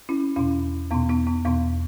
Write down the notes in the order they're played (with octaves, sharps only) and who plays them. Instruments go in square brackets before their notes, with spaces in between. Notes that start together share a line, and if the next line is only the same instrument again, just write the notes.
[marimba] C#4 E4
E2 B2 C#4 E4
E2 B2 B3 D#4
B3 D#4
B3 D#4
E2 B2 B3 D#4